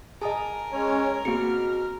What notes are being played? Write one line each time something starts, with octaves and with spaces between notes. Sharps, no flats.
G#4 A#4 D#5 G#5 A5 D#6
G#3 C#4 C#5
B2 A#3 C4 F#4 G#4 F6 C#7